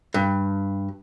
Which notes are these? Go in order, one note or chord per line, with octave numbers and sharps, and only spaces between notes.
G2